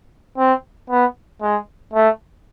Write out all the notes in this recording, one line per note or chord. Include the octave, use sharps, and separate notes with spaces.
C4
B3
G#3
A3